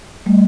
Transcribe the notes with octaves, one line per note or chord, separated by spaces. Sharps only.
G3 A3